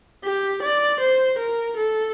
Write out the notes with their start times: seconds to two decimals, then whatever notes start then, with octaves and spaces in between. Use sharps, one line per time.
0.24 G4
0.62 D5
1.00 C5
1.38 A#4
1.77 A4